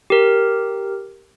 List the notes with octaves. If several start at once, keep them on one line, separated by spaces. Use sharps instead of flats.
G4 A#4